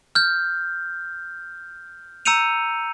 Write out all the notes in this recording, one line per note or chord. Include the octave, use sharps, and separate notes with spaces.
F6 G6
A#5 E6 G6 C#7 D#7 F7